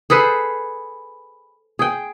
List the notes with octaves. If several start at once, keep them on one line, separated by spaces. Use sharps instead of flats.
G#4 A4 B4 C5
G#4 G5